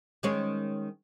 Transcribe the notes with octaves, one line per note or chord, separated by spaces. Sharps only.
D#3 G#3 C#4